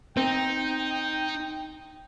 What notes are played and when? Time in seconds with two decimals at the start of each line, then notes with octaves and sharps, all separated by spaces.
0.17 C4 D#4 G5